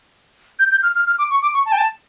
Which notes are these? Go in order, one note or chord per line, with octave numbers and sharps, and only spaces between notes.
G6
G6
F6
F6
F6
D6
C#6
D6
C#6
A5
G5
A5